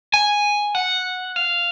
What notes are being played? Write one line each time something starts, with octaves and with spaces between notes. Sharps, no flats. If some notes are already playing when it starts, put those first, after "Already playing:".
G#5
F#5
F5